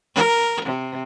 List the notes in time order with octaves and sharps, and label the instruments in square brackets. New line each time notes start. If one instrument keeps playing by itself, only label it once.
[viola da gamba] A#4
C3